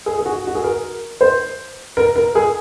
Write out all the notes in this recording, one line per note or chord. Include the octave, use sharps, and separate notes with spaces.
G#4
G#4
F#4
F#4
G#4
A#4
C5
A#4
A#4
G#4